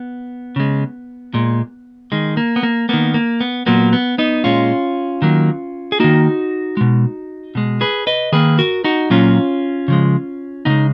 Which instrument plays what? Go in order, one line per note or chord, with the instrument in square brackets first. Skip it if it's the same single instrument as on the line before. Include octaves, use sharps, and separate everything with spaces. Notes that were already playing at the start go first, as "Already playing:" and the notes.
Already playing: [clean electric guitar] B3
C#3 G#3
A#2 G#3
D#3 G#3
A#3
B3
A#3
D#3 A#3 B3
A#3
B3
A#2 F#3 A#3 B3
B3
B3 D#4
A#2 G#3 C#4 F4
D#3 F#3 A#3
G#4
D#3 A#3 D#4 F#4
B2 G#3
B2 G#3
G#4 B4
B4 D#5
D#3 A#3 G#4 B4
F#4 A#4
D#4 F#4
A#2 F#3 A#3 C#4 F4
C#3 F3 G#3
C#3 G#3 B3 D#4